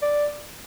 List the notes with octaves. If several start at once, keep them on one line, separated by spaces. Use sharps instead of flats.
D5